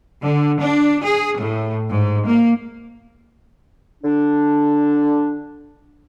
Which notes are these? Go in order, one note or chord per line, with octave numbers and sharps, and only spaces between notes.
D3
D4
G#4
A2
G#2
A#3
D3 D4